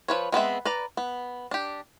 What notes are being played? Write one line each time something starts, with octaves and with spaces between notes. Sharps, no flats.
F3 B4 C#5
G#3 B3 C4 E5
B4 D5 A#5
B3
D4 G4